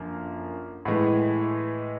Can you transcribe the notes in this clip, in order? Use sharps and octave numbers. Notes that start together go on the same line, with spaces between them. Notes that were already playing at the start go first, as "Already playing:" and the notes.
Already playing: F#2 D3 F3 A#3
A2 E3 G#3